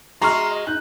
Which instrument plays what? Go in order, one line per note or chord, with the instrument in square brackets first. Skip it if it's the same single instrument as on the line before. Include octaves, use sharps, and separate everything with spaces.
[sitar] G#3 F#4 [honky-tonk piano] A#5 C#6 F6 [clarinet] C6
[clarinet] D#5
[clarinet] D#4 [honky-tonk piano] F#6